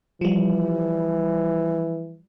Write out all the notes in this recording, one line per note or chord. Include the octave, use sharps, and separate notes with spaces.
E3 F3 G3